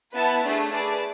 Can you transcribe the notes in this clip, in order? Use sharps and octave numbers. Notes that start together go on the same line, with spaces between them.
B3 E4 B4 E5 A5
A3 D4 G#4
G#4 B4 D5 A5